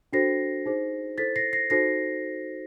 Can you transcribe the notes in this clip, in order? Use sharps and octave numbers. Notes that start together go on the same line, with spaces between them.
D4 F#4 A4 C5 A#6 C7
D#4 G#4 C5
E4 A4 C5 A6 B6
A#6 C7
A#6 C7
D#4 F#4 A4 C5 A#6 C7